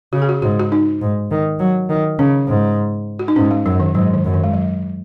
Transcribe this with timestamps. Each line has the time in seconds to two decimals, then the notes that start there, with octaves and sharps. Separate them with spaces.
0.13 C#3 F#4
0.22 G#4
0.29 F#4
0.42 G#2 F#4
0.60 F#4
0.72 D#4
1.02 G#2
1.31 D#3
1.59 F#3
1.89 D#3
2.19 C#3 C#4
2.48 G#2
3.19 F#4
3.28 D#4
3.36 G#2 C#4
3.51 G#3
3.66 F#2 F#3
3.80 D#3
3.95 G#2 F#3
4.14 D#3
4.25 F#2
4.34 D#3
4.44 G#3
4.53 F#3